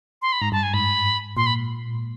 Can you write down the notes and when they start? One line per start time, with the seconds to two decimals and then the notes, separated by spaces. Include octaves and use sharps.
0.22 C6
0.32 B5
0.42 G#2 A#5
0.52 G2 A5
0.63 G#5
0.74 G#2 B5
1.37 A#2 C6
1.46 B5